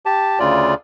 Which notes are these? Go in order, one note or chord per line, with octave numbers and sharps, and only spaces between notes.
G4 A5
D2 C#3 F4 D5